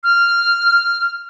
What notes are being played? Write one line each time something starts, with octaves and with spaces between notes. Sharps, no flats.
F6